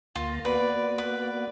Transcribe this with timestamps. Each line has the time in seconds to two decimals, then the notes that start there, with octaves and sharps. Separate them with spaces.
0.15 D2 A#3 F4 A#5
0.45 A#3 B3 F#4 B4 D5
0.98 B4 D5